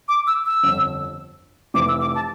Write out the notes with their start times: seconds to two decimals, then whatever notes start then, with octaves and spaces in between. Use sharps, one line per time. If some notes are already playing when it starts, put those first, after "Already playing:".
0.08 D6
0.27 E6
0.46 E6
0.63 G1 F2 D3
1.74 F1 F2 E3 D6
1.88 E6
2.01 D6
2.15 A5